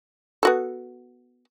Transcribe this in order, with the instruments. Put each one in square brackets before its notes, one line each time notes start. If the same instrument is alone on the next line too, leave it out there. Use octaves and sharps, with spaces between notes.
[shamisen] B3 F#4 A4